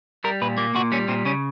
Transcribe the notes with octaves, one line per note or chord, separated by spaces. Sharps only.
G3 A#4
A#2 B4
A#3
A#2 F#4
G3 C#4
A#2 C4
C#3 C#4